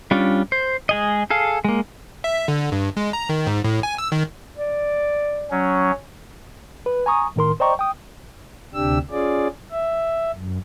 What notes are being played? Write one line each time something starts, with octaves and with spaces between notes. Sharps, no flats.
G3 C#4 D4 F4
C5
G#3 G#4 D#5
G#4 A4 F5
G#3 A#3
E5
D3
G2
G#3
A#5
D#3
G#2
A2
G#5
E6
D#3
D5
F#3 C#4
B4
G#5 A#5 C#6 D#6
A2 D#3 A#4 C6
C5 D5 D#5 G5 A#5 C#6
G5 D#6
D2 C3 D4 G4 E6
C#4 F4 G#4 D5
E5
F#2